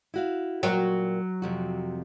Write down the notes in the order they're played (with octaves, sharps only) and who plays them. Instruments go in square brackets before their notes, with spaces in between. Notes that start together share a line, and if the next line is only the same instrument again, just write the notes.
[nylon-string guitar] E4 F#4 F5
[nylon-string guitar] A#2 A#4 G5 [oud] F#3
[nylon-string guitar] F2 C3 F#4